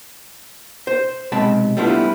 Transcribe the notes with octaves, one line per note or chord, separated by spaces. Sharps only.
C5
B1 C3 G#3 G5 A5 B5
G3 A3 B3 D4 E4 F4